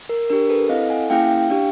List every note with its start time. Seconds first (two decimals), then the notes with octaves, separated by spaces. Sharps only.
0.09 A#4
0.30 D4 G4 A#4
0.50 A4 B4
0.69 C4 E4 A4 D#5 F5
0.90 F#5 G#5
1.10 A#3 C#4 E4 G#4 F5 G5
1.50 D4 G4